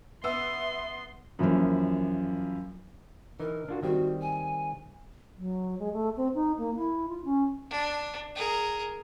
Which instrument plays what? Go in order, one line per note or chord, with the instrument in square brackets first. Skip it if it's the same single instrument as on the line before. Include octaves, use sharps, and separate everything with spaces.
[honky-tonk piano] B3 E6 [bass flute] E5 [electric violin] C6
[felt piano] F#2 E3 F3 A#3
[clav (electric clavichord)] E3 D#4 [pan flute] A#4
[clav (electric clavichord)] D4 F4 F#4
[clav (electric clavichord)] D#3 G3 C4 [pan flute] F#4
[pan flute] G#5
[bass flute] F#3
G#3
A3
C4
D#4
A#3
E4
F4
C#4
[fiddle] D4
G#4 A#4